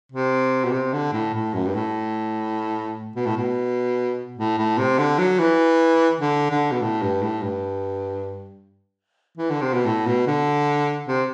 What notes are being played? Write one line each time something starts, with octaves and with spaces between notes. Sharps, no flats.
C3
B2
C3
D3
A2
A2
F#2
G2
A2
B2
A2
B2
A2
A2
C3
D3
F#3
E3
D3
D3
B2
A2
G2
A2
G2
E3
D3
C3
B2
A2
B2
D3
C3